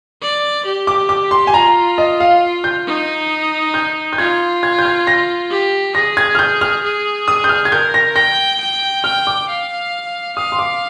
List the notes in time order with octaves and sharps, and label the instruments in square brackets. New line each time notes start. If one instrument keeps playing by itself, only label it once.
[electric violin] D5
G4
[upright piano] D6
D6
C6
G#5
[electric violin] F4 [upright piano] A#5
[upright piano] D#5
F5
G6
[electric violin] D#4
[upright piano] G6
G6
[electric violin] F4 [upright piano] G#6
[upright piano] G#6
G6
G#6
A#6
[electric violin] G4
[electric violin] G#4 [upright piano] A#6
[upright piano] G#6
F6
G6
F6
[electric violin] G#4
[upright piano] D#6
G6
F6
G#6
[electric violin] A#4 [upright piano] G6
[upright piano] A#6
[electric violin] G5 [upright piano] A#6
[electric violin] G5
[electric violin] G5 [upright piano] F6
[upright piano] D6
[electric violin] F5
[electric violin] F5 [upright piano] D#6
[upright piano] C6
D6